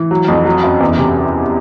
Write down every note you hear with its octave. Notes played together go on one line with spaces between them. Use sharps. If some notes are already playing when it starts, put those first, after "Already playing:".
Already playing: E3
F#3
F2
F#3
F#2
E2
C3